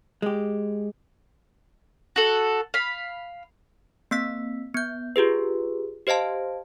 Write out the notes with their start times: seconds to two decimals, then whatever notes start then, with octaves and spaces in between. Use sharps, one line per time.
0.22 G#3 G4
2.16 F#4 A4
2.74 F5 B5
4.11 A#3 C4 E6 B6
4.74 B3 G6
5.16 F4 G4 G#4 B4
6.07 G4 C5 D#5 F5 A5